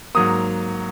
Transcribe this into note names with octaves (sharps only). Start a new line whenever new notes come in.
G#2 F#3 A#3 D#6